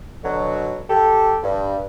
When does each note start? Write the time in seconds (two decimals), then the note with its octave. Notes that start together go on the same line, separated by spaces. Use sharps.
0.23 B2 D3 F#3
0.89 G4 A4
1.43 G2